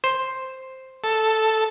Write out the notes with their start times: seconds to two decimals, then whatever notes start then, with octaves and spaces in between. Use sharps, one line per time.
0.04 C5
1.04 A4